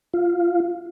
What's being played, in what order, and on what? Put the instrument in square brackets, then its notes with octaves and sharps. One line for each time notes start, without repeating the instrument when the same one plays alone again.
[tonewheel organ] F4